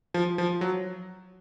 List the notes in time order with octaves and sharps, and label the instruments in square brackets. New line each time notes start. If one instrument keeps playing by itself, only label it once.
[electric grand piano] F3
F3
F#3